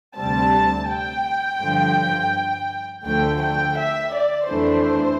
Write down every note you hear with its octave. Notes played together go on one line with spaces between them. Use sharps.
D2 C3 G3 C4 A5
G5
G2 D3 F3
D2 D3 F3 A3 G5
G5
E5
D5
F2 E3 A3 D4 C5